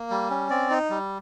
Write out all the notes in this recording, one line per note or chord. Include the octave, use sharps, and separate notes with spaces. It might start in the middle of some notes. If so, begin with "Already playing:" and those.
Already playing: A#3
G3
C#4
C4 D5
D#4
G3